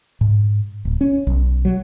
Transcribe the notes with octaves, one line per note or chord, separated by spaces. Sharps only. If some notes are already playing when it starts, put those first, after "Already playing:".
G#2
D1
C#4
B1
F#3